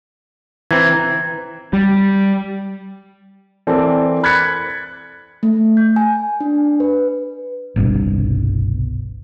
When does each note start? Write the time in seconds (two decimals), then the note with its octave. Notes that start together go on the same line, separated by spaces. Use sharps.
0.71 E3 C4 A#5 G#6
1.73 G3
3.67 E3 C4 A4 A#4 D5
4.23 B5 F#6 G#6 A6 B6 C#7
5.43 A3
5.77 G6
5.96 G#5
6.40 D4
6.80 B4
7.76 G1 C2 G2 B2